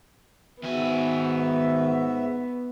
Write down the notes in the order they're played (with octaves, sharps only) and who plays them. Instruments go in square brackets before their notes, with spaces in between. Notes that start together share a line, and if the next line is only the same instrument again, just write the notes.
[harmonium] G#2 F#4 E5 [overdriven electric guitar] D#3 G#5 [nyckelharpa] B3